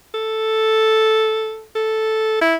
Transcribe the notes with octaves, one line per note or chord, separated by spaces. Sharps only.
A4
A4
E4